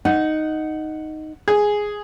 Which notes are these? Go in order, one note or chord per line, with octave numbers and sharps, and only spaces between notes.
D#4 F#5
G#4